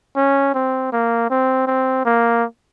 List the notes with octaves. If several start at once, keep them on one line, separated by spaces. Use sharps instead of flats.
C#4
C4
A#3
C4
C4
A#3